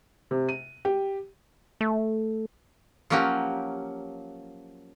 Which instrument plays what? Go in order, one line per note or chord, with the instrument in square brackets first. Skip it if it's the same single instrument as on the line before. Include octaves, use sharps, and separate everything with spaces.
[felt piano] C3
D#7
G4
[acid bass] A3
[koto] F3 F#3 A#3 C#4 F#4 G4